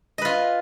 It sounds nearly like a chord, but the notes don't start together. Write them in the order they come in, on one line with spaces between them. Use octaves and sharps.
D#5 B4 F4